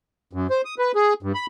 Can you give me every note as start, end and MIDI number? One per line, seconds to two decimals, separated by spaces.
0.33 0.47 42
0.50 0.61 72
0.65 0.75 87
0.79 0.92 71
0.95 1.14 68
1.23 1.33 43
1.34 1.46 83